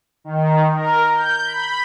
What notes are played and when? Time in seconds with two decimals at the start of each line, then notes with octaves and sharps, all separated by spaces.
0.24 D#3
0.76 A#4
1.14 G6
1.45 B5